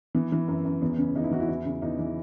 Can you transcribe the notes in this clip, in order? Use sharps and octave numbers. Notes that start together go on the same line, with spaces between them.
E3 B3
E3
F#2
F#2
E2 B3
C#3 C#4
E2 D#4
E4
E3 F#4
E4
E2
C#3
E2 D#4
E3